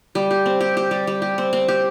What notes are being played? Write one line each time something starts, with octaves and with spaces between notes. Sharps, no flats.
G3
G4
C4
G4
G4
G3
G3
G4
C4
C4
G4